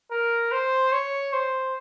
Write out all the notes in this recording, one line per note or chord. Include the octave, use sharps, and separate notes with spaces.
A#4
C5
C#5
C5